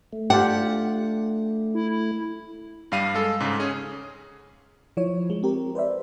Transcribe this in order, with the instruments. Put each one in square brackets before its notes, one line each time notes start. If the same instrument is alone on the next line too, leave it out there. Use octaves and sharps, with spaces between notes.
[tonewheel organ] A3
[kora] D4 F4 G4 [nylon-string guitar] F#5
[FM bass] E4
[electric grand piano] G2 G3 F5 D#7
G#3 A4
G#2 C#3
C#4 G#4
[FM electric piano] F3 E4 C#5
G#3
C4 G4 A#4
B4 C5 D5 E5